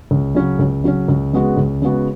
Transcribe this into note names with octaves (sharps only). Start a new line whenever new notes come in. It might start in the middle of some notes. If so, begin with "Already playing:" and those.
C#2
C#3 F#3 C#4
C#2
C#3 F#3 C#4
C#2
C#3 G#3 B3 F#4
C#2
C#3 G#3 B3 F#4